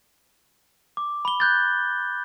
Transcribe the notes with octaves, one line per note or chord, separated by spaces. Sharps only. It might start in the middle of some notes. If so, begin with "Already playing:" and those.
D6
B5 G7
F#6 G6 A6